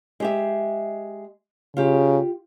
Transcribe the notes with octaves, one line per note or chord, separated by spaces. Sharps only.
G#3 G4 E5
C#3 F4 G4